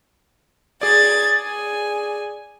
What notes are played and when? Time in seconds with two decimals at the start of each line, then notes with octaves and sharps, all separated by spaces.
0.81 G#4 D5 G#6 A6
1.42 G#5